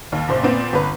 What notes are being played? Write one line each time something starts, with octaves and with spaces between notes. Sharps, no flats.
D#2
F#1 A#2 C5
A#2 B3 C4
G1 B4